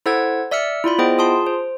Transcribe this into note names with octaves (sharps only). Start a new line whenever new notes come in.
E4 A4 C5 F#5 E6 G#6
D5 E5 E6 F6 C#7
E4 F4 D5 B5
B3 E4 G#4 C5 D#5 G5
F4 G#4 A5 C6
C5